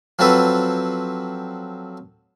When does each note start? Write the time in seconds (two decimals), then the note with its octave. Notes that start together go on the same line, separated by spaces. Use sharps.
0.19 F3 F#3 C4 A4 B4